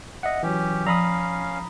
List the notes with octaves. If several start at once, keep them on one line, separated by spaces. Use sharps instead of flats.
D#5 E5 F#5
E3 F#3 C#4 G4
F3 C#4 F5 A#5 B5 D#6